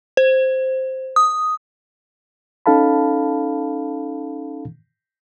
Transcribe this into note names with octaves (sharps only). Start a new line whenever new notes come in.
C5
D#6
C#4 D#4 A4 F5 A5 B5